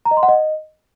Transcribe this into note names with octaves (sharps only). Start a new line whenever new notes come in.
A#5
D#5
C6
F#5
D#5